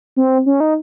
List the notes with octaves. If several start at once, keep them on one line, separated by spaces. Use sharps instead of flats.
C4
C#4
D#4